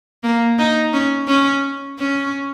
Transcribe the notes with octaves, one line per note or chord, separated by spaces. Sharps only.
A#3
D#4
C#4
C#4
C#4